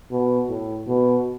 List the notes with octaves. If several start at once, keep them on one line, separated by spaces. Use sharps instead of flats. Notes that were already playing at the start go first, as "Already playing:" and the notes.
B2
A2
B2